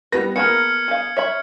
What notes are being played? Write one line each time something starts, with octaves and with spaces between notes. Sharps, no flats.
G3 B3 B4 A#6
A#3 B3 G#4 A#4 A5 F6 G#6 C#7
G#4 F5
C#5 E5 B5